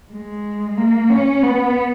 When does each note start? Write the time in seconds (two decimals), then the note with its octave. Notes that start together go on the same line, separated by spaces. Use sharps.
0.13 G#3
0.77 A#3
1.10 C#4
1.42 B3